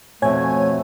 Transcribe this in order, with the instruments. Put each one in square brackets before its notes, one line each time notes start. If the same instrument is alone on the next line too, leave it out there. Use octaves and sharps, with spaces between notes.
[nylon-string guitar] F2 B2 [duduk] A3 [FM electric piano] C#5 G#5 G#6